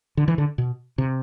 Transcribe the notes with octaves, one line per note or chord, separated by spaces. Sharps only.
D3
E3
D3
B2
C3